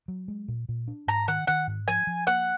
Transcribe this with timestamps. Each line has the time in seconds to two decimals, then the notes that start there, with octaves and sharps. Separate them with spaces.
0.08 F#3
0.28 G#3
0.48 A#2
0.69 A#2
0.88 D4
1.07 G#2 A#5
1.28 D#3 F#5
1.47 D#3 F#5
1.67 G#2
1.88 F3 G#5
2.07 F3
2.27 A#3 F#5